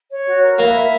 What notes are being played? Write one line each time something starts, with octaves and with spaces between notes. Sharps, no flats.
C#5
F#4
A#4
A#3 E4
E5